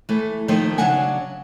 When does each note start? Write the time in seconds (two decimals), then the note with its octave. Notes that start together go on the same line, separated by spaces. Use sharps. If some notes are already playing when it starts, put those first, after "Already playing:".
0.09 E3 A3
0.48 D#3 F3 A3 A#3 D#4 F4
0.78 C#3 F#3 D4 F#5 G#5